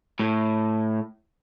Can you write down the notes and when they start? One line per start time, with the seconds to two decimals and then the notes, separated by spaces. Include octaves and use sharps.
0.19 A2